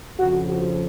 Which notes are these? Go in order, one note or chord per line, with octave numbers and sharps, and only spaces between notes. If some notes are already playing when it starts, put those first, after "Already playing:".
F2 C#3 F3 F#4
F#4